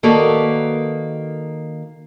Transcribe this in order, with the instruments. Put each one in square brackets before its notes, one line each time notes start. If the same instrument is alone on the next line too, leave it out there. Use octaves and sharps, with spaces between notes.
[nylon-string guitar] D#3 A#3 F#4 A4 B4 D5